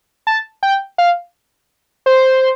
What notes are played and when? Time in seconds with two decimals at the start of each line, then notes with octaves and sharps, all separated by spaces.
0.27 A5
0.63 G5
0.98 F5
2.06 C5